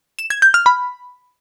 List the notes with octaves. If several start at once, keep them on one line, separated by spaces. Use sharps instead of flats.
E7
G#6
G6
F6
B5